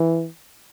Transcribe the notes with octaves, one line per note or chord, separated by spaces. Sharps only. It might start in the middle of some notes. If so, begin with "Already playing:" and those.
Already playing: E3